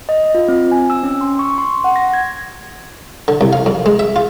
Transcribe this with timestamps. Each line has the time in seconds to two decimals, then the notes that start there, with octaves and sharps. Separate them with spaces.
0.09 D#5
0.35 F4
0.48 C4
0.71 G#5
0.90 E6
1.03 C#4
1.21 C6
1.39 C#6
1.58 C6
1.84 F#5
1.96 A#6
2.14 G#6
3.28 D3
3.41 C2
3.53 F5
3.66 F2
3.86 G#3
3.99 E5
4.16 F4